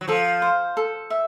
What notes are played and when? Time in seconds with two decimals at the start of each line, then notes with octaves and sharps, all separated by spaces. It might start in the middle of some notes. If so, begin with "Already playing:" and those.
0.01 F#3
0.08 F3 A4
0.42 C5
0.77 A4
1.10 E5